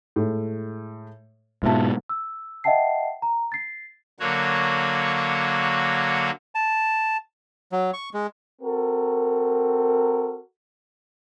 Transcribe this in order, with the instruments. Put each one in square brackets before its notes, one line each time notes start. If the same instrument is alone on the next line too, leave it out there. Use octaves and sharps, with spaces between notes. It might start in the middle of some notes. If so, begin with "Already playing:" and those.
[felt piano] A2 G#3
[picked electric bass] G#2 B2 [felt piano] F4 E5 A5
[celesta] E6
D#5 E5 F#5 G5 A5 C7
A#5
A6 C7
[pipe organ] D3 F#3 A#3 F#4 C#5
[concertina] A5
[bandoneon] F#3
C#6
G#3
[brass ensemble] C4 F#4 A4 A#4